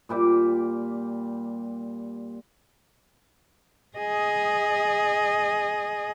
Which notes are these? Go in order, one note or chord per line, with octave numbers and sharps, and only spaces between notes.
A#2 G3 G5 D6
G#4 D#5